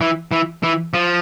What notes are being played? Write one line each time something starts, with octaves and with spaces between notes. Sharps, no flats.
E3
E3
E3
F3